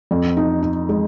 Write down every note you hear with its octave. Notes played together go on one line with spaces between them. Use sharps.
F2
D#4
D#4
G#3